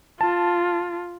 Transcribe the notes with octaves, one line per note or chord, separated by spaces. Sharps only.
F4 A5